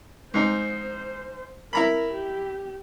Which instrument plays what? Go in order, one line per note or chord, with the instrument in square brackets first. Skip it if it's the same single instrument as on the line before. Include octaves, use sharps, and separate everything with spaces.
[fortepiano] G#2 D#4 [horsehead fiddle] C5
[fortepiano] E4 A#5 B5 [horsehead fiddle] A#4
[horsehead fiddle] G4